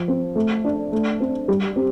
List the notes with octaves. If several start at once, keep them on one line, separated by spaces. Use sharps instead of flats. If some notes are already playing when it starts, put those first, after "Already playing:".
Already playing: F3
C4
A3
D4
A3
C4
G3
C4